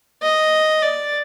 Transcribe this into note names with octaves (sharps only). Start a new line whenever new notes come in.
D#5
D5